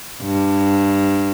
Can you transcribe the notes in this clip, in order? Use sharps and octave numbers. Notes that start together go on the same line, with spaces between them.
G2